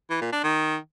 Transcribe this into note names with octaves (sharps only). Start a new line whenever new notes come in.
E3
A#2
D4
D#3